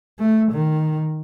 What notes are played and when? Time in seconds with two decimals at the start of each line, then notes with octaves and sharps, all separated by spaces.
0.19 A3
0.52 D#3